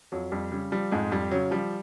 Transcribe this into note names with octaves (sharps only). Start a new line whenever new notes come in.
F2 F#3
F2 G3
C#3 G3
F3 G3
F2 G#2 G#3
F2 G3
C#3 F#3
F3 G3